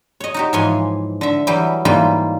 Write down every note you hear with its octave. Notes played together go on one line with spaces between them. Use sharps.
C#5 D#5
D#4 F#4 G4
G#2 E3 F3 C#5 G#5 C6
D3 E5
E3 F#3 G3 G4
G#2 E3 G3 A#3 F4 G4